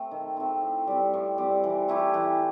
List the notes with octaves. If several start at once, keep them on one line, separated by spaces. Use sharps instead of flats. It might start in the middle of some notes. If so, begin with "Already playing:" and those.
Already playing: A3 C4
D#3
A3 C4
A2
G3 C4
A2
G3 C4
E3
A3 E4 G4
E3